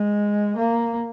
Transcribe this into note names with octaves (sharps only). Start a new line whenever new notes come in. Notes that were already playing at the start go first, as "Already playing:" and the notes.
Already playing: G#3
A#3